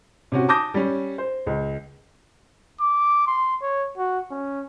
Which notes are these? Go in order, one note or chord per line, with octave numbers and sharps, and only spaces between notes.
C3 C#4 F#4
A5 D6 D#6 G6 A#6
G3 C#4
C5
C#2
D6
C6
C#5
F#4
C#4